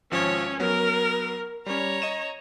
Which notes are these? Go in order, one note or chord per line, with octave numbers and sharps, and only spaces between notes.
G#1 F3 C#4 C#5
F#3 B3 A#4
G3 C#4 C#5 A#5
D#5 D#7 E7